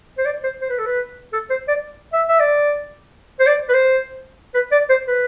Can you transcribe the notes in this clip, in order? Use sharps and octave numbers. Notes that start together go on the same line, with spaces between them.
C5
D5
C5
C5
B4
A4
B4
A4
C5
D5
E5
E5
D5
C5
D5
B4
C5
B4
D5
C5
B4